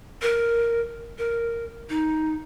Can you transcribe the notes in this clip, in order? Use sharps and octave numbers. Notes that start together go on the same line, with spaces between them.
A#4
A#4
D#4